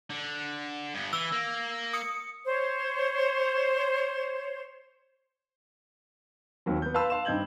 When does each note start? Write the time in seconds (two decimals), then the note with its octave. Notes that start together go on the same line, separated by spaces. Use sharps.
0.10 D3
0.95 G2 B3
1.13 E3 E6
1.32 A#3
1.93 D#6 C#7
2.46 C5 C#5
6.66 D#2 F#3 C4
6.82 B3 G6
6.94 B4 F5 A5 B5 C6 E6
7.10 F5 C6 E7
7.25 G2 C4 D#4 G6 G#6 F#7